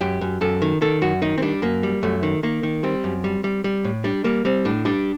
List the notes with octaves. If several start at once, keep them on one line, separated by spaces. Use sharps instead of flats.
F#2 G4
F#2
F#2 A4
D#3
D#3 A4
F#2 F#4
D#3 D#4
C4
G3 D4
F#2 A#3
G3
F#2 A3
D#3
D#3 A#3
D#3
G3 C4
F#2
G3
G3
G3
A2
G3 D4
G3 A#3
G3 C4
A2 D4
G3 D4